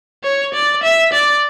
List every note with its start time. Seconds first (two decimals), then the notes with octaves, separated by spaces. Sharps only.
0.24 C#5
0.54 D5
0.83 E5
1.13 D5